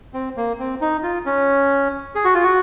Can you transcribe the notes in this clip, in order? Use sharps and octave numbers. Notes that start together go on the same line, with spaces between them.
C4
A#3
C4
D#4
F4
C#4
G#4
F#4
F4
F#4